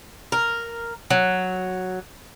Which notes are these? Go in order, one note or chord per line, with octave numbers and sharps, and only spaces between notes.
A#4
F#3